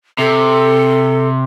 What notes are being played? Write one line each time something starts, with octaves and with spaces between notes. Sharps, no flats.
C3 A4